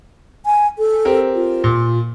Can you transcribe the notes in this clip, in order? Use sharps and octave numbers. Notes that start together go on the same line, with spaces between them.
G#5
A4
C4 G4 A#4
F4
A#2